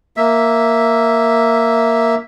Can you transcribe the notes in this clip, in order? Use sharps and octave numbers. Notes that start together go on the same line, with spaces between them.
A#3 E5